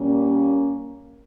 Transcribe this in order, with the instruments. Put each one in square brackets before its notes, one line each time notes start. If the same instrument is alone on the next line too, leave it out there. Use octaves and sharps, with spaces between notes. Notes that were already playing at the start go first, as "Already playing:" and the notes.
Already playing: [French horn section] A#2 G3 A#3 C#4